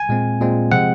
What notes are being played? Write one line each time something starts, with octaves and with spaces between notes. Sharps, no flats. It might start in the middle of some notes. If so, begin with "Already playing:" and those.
Already playing: G#5
A#2 G#3 C4
A#2 G#3 C4
C3 F3 G#3 C4 F#5